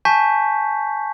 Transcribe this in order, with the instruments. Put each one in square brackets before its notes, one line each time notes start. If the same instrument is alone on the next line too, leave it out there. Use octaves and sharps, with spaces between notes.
[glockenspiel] G#5 A5 C#6 G6 B6